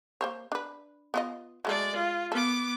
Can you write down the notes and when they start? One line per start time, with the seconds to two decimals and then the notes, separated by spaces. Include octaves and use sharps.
0.21 A#3 C5 C#5
0.52 D4 B4
1.14 B3 F4 D#5
1.65 F#3 G#3 A3 A4 D5
1.96 F4
2.32 B3 A4 D6